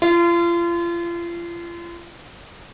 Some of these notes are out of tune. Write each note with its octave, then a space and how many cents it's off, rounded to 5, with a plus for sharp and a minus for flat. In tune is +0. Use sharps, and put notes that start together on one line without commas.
F4 -35